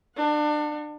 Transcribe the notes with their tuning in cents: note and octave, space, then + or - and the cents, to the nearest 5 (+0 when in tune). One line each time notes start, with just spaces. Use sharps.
D4 +30 F#5 -30